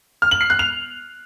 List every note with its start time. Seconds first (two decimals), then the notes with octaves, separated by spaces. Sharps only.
0.22 F6
0.31 F#7
0.41 C7
0.50 F#6
0.59 F7